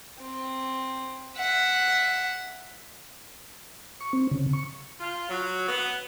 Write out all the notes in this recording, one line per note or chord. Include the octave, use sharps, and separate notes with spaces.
C4
E5 F#5
C#6
C4
C#3
C#6
F4
F#3
B3